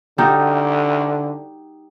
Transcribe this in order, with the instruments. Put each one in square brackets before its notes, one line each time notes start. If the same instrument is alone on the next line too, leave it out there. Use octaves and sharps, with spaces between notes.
[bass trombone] D3 [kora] G3 D#4 F#4